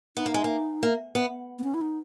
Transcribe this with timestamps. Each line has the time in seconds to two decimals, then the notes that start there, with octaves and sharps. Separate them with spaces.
0.17 B3 D#4
0.26 A#3
0.34 G#3
0.44 A#3
0.83 A#3
1.15 B3
1.59 B3
1.64 C#4
1.74 E4
1.81 D#4